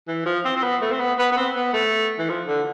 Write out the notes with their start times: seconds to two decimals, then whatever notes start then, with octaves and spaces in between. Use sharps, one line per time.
0.08 E3
0.26 F3
0.44 C4
0.56 C4
0.63 B3
0.81 A3
0.92 C4
1.00 B3
1.19 B3
1.32 B3
1.37 C4
1.55 B3
1.73 A3
2.19 E3
2.29 F3
2.47 D3